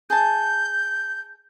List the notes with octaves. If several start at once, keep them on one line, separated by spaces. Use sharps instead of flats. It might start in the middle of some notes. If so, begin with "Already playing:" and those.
G#4 A5 G6